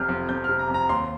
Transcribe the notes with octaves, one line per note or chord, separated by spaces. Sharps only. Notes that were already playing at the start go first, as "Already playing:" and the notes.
Already playing: F1 C3 F6 G6
F2
F2 G6
C3 F6
A#5
F2 A#5
D#2 C6